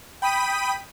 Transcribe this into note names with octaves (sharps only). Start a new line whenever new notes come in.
G5 B5 D#6 B6 D#7